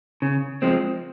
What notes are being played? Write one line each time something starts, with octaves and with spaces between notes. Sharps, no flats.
C#3
F3 G#3 C4